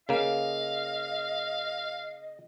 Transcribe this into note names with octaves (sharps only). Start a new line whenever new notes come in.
C#3 A#3 D#5 F5